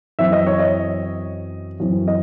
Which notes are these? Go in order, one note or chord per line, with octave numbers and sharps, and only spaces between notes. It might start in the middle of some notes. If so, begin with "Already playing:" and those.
F#2 E3 C4 E5
D#5
C#5
D#5
F#2 E3 C4
D#5